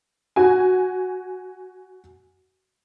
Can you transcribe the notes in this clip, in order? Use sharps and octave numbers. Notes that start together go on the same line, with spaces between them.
F#4 G#5